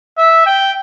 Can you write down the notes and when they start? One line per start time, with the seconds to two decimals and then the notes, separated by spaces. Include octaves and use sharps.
0.18 E5
0.46 G5